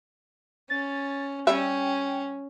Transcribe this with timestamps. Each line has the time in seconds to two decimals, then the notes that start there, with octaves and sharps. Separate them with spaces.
0.70 C#4 A6
1.47 G3 C#4 E5 G5